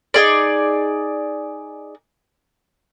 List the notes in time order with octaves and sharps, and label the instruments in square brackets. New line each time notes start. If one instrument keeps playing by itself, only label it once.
[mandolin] D#4 G#4 D5